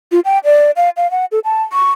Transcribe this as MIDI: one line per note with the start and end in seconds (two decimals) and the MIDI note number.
0.12 0.20 65
0.25 0.39 79
0.44 0.71 74
0.76 0.90 77
0.97 1.10 77
1.11 1.25 78
1.32 1.39 69
1.44 1.62 81
1.73 1.91 85